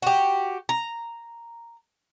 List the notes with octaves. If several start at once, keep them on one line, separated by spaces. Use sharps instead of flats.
F#4 G4
A#5